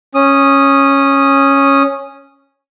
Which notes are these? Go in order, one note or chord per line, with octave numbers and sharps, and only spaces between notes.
C#4 D#6